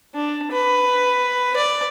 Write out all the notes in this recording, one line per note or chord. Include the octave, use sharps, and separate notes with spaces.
D4
B4
D5